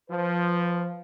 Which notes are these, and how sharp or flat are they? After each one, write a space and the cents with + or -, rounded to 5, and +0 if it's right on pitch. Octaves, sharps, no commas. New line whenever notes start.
F3 +0 B4 +25